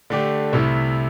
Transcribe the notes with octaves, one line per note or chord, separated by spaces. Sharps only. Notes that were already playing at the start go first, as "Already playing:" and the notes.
D3 A3 D4 G4
C2 C3 A3 E4